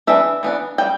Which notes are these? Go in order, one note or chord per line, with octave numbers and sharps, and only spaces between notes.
E3 B3 D4 E5
E3 B3 D4
G3 G5